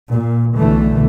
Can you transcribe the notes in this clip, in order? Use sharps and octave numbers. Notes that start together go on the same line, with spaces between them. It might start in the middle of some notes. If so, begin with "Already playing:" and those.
A#2
B1 D3 E3 A3